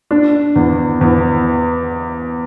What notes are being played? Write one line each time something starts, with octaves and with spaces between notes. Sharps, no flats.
D4
E2
E2